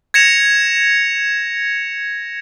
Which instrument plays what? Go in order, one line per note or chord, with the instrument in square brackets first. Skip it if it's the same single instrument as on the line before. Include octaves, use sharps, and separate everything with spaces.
[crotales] G#6 A#6 C#7 E7 F7